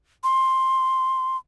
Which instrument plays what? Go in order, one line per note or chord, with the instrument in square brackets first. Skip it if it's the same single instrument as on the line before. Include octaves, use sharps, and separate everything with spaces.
[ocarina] C6